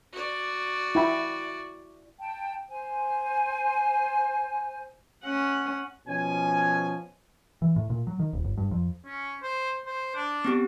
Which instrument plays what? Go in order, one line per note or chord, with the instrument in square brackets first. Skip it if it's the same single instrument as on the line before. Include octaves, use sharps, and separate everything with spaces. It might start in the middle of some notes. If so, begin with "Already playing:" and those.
[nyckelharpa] F#4 D5
[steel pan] E4 G5 B5
[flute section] G5 A5
C5 G#5
[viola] C#4 F#5
[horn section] B2 F3 C#4 G#5
[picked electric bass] E3
A2
A#2
F#3
D#3
D#1
G1
G2
F2
[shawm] C#4
C5
C5
D4
[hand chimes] B3 C4 G4